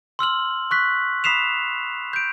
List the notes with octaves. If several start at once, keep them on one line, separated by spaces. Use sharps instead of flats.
C6 E6 F6 F#7
C#6 F#6 B6
B5 D#6 B6 C7 E7 F7
G6 D7